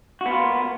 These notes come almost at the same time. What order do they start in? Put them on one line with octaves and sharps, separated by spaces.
F#4 B3 F4 A#3